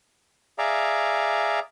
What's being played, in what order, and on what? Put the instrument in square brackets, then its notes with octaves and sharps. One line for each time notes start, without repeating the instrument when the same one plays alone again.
[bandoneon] G#4 D5 E5 F5 A#5